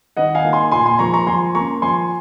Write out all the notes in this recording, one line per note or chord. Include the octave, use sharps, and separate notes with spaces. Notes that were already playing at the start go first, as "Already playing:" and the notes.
D#3 D#5 F#5
F5 G#5
A#3 D#4
G#5 C6
A#2 G#5 C6
G#5 C6
F3 A#3 A#5 C#6
A#5 C#6
F3 G#5 C6
A#3 C#4 A#5 C#6
F3 G#5 C6